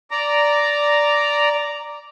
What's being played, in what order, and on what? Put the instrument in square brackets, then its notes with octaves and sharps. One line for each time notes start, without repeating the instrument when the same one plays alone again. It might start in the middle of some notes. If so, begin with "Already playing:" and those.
[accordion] D5 A#5